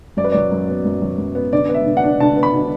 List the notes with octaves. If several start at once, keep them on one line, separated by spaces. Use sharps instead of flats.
F#2 D5
B4
F#3 D5
F#2
B3
F#2
F#3
F#2
B3
D3 D5
B3
E5
D3
F#5
D4
D3 A5
B3
B5
D3